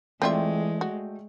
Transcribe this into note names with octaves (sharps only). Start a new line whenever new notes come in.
E3 G#3 A3 C4 F4 D5 E5 G5
F#4